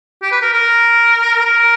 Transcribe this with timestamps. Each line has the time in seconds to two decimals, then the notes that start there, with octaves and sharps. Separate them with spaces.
0.22 G4
0.32 B4
0.42 A#4
0.53 A#4
1.45 A#4